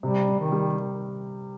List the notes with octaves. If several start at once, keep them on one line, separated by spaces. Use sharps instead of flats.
C3 G3
C3
D#3
G3